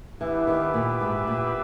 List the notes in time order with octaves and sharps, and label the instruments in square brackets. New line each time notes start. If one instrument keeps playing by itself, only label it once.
[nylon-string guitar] E3 [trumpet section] B3 D4 G4 B4 E5
[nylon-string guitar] D#3
A#2
G#2
A#2